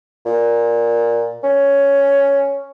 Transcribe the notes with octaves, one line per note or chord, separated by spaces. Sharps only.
A#2
C#4